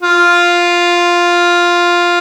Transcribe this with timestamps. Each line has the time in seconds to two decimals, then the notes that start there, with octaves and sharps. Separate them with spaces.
0.02 F4